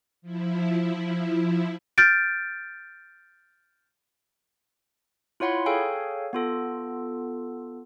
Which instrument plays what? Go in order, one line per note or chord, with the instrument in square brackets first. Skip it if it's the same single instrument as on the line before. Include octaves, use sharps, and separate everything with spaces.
[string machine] F3 E4
[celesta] F6 G6 A6 D7
[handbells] E4 F4 C#5 F#5 B5 C6
G#4 A4 C#5 F5 G5 G#5
B3 F4 A4